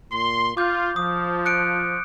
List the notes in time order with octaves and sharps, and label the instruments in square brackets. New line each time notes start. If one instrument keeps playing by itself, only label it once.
[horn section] A#2 C6
[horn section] F4 [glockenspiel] D6 G6
[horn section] F3 [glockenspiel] D#6
[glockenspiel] F#6 C#7 D7